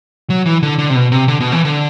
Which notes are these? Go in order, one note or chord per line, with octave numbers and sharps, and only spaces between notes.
F#3
E3
D3
D3
C3
B2
C3
D3
B2
E3
D3